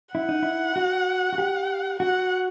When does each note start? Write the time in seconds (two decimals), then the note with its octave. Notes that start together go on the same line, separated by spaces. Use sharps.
0.15 E4 F#5
0.29 D#4
0.43 E4
0.76 F#4
1.33 F#4
1.38 G4
2.00 F#4 F#5